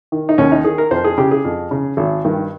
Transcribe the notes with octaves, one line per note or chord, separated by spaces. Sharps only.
D#3
D#4
D#2 C#4
D#4
D#3 G#4
A#4
F2 C5
G#4
C#3 G4
G#4
F2
C#3
G#1
G2 D#3